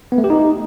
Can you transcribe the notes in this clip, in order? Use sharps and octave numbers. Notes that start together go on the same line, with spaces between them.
B3
A3
G4
D#4